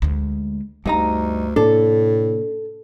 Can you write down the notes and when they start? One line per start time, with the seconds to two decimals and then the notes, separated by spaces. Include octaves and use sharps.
0.02 D2 G#3
0.86 D2 G2 D4 D#4 A#5
1.56 A2 C3 A#3 D4 A4